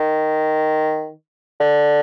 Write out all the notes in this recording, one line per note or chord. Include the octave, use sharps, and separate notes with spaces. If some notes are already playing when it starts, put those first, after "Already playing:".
Already playing: D#3
D3